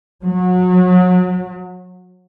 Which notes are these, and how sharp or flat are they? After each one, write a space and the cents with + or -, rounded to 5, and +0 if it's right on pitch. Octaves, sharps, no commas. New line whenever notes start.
F#3 -30